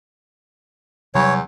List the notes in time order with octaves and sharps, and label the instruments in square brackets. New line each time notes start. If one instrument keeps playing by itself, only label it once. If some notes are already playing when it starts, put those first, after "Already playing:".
[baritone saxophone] E2 [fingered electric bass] C3 F#3 G3 [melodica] C#5